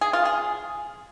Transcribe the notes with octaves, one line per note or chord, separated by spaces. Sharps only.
G#4
F4
G#4